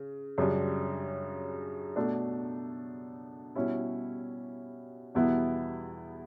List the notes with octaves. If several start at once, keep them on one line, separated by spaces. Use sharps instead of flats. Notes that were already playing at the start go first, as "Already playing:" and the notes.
Already playing: C#3
F#2 C#3 G3 D4
B2 A3 D4
B2 G3 C#4 E4
E2 B2 G3 B3 E4